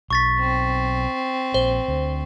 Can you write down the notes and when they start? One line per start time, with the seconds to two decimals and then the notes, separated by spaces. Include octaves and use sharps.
0.11 B1 C#6 A6 B6
0.40 C4
1.54 A#1 C5
1.88 D2